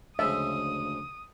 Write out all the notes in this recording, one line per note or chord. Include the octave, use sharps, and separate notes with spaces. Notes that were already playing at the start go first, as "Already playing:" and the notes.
D2 C#3 F3 G#3 E5 D#6